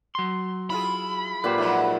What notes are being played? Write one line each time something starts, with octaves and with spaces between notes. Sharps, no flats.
F#3 C6
E4 F4 G#4 B5
A#2 G4 B4 C5 F#5
G#2 F3 F#3 E5